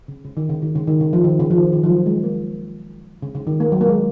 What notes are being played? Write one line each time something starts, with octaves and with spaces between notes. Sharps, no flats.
C#3
C#3
D#3
C#3
D#3
C#3
D#3
C#3
F3
D#3
C#3
F3
D#3
D#3
F3
F#3
G#3
A#3
C#3
C#3
D#3
A#3
F#3
A#3
G#3